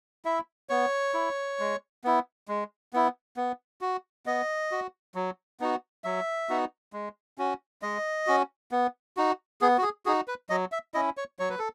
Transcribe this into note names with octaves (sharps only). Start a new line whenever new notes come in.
E4 E5
B3 C#5
E4
G#3
B3 E4
G#3
B3 E4
B3
F#4
B3 D#5
F#4
F#3
B3 D#4 F#4
F#3 E5
B3 D#4 F#4
G#3
C#4 F#4
G#3 D#5
C#4 F#4
B3
D#4 F#4
B3 G#4
F#4
G#4
D#4 F#4 G#4
B4
F#3 D#5
E5
C#4 E4 D#5
C#5
F#3 C#5
B4
A4